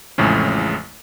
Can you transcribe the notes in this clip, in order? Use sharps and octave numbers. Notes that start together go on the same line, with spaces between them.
A1 F2 A2 C#3 G#3